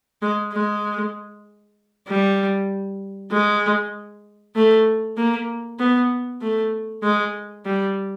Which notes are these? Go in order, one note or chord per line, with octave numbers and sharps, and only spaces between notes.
G#3
G#3
G3
G#3
A3
A#3
B3
A3
G#3
G3